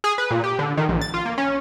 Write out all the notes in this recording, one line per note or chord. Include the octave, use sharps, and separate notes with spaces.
G#4
B4
A#2
G4
D3
D#3
A#1
A6
F4
A#3
C#4